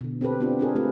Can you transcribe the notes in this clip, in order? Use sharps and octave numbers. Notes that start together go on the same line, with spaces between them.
B2 D3
C4 G4 A4 B4
B3 C4 D4 F4 G4
C4 D4 F4 G#4 A#4
A3 C4 F4 G4 B4